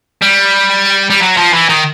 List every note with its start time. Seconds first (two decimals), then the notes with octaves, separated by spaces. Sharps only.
0.22 G3
1.10 G3
1.20 F#3
1.37 F3
1.53 E3
1.69 D#3